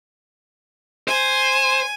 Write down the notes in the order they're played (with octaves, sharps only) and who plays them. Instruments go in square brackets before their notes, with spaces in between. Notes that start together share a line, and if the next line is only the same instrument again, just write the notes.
[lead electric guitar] C5 [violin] G#5